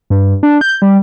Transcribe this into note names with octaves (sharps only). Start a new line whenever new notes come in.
G2
D4
G6
G3